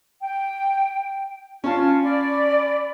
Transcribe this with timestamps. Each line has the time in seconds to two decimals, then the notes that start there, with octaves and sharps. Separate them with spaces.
0.20 G5
1.64 C#4 F4 A5
2.03 D5 B5